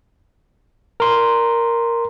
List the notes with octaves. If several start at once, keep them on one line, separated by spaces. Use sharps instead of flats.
A#4 C6